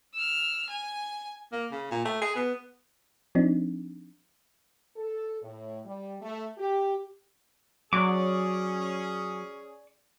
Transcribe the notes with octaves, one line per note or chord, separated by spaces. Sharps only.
E6 F6
G#5
A#3
C#3
A#2
A3
G#4
B3
F3 C4 D4 D#4
A4
A2
G3
A3
G4
F#3 C#4 G#4 D5 C#6 D6